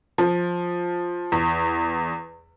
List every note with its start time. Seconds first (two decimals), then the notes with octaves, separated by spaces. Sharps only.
0.18 F3
1.32 E2